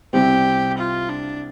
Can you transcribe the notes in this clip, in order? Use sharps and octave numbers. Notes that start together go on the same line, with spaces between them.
C2 C3 G3 C4 G4
F4
D4